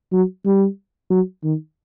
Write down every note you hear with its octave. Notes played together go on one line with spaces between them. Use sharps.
F#3
G3
F#3
D#3